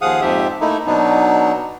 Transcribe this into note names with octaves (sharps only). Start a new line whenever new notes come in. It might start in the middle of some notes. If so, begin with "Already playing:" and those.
D#2 F3 G#4 F5 F#5 D#6
F2 G#2 F3 G4 E5
A3 A#3 D#4 E4
B2 F#3 B3 D4 D#4